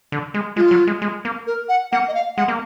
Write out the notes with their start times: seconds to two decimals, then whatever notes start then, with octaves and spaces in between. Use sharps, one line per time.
0.12 D3
0.34 G#3
0.56 G#3 F4
0.71 F#3
0.87 G#3
1.02 G#3
1.25 A#3
1.47 A#4
1.69 F#5
1.92 A#3 F#5
2.08 D#5
2.14 F5
2.37 G#3 F#5
2.48 A#3